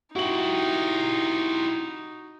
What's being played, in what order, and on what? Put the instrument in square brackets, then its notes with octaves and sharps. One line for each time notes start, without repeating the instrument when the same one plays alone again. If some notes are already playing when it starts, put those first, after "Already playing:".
[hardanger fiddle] D#4 [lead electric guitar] E4 G4 [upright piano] F#4 F#7